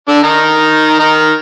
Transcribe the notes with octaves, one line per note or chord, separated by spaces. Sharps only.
D3 D4
D#3 D#4
D#3 D#4